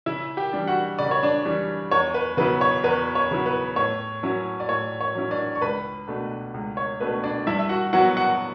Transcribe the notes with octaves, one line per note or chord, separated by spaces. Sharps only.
C#3 E4 E5
G4 G5
E3 G3 D4
F#4 F#5
C#3 D5
C#5
D4 D5
E3 G3 D4
E2 C#5
B4
C#3 F#3 B3 E4 B4
C#5
E2 B4
C#5
C#3 F#3 B3 E4
B4
A2 C#5
F#3 C#4 E4
D5
A2 C#5
C#5
F#3 C#4 E4
D4 D5
C#6
C#2 B4 B5
B2 A3 D4
C#2
C#5
B2 A3 D4 B4
D4 D5
G2 E4 E5
E5
F#4 F#5
F#3 B3 E4 F#4 F#5
F#4 F#5